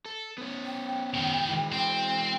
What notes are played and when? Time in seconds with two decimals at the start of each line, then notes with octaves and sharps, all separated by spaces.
0.06 A4
0.38 B3 C#4
0.66 G5
1.14 B2 D#3
1.49 E3 G#3
1.72 C4 G5